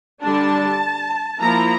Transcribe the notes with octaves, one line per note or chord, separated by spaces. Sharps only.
D3 G3 D4 A5
F3 A#3 E4 A#5